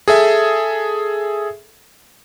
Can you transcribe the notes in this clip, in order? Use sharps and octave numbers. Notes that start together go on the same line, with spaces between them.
G#4 A4 E5